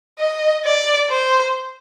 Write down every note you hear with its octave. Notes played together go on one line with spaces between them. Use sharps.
D#5
D5
C5